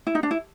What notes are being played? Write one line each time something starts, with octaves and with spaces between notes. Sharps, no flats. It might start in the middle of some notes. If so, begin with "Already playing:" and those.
E4
D#4
D4
E4